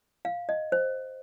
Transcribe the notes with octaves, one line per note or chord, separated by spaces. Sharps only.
F5
D#5
C5